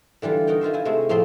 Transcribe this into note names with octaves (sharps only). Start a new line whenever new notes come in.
D3 E3 G3 F4
D#4 F#4 A#4 G5
D#3 F4 C5 E5
E4 G#5
C3 G#3 A3 C4
A2 F3 B3 C4 C5 C6